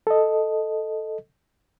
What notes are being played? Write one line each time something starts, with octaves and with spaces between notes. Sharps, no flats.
A4 D#5